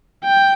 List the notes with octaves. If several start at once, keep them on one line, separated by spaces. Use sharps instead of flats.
G5